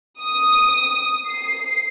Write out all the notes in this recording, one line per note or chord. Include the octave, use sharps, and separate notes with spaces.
D#6
C7